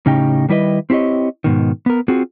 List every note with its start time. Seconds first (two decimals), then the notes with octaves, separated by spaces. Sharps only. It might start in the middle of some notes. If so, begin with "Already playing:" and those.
0.06 A2 C#3 C#4 D#4 G4 G5
0.49 D#3 G3 E4 B4 D#5
0.90 C4 E4 G4 C#5 D#5
1.44 G#2 B2 D#3
1.86 B3 A#4
2.08 C4 F4 F#4 G#4